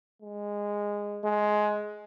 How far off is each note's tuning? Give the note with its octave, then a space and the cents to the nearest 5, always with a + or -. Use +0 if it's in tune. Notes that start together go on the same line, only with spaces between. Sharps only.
G#3 -15
G#3 +15